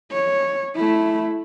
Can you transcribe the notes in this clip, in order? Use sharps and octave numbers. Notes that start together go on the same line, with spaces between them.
C#5
A3 E4